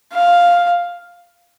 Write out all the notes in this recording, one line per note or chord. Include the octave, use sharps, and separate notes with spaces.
F5